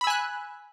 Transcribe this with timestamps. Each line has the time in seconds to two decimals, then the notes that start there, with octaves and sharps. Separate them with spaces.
0.01 B5
0.04 E6
0.07 G#5
0.10 F#6